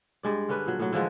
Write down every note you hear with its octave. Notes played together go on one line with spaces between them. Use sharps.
G2 G#3 D5
D3 C#4 D4 B4
A#2 F#3
A2 F#3
D3 E3 F3 G#3